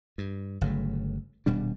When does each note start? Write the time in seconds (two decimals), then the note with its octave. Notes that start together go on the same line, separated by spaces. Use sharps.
0.18 G2
0.61 G1 C#3 F#3 A3
1.46 D#1 B2 G3 D4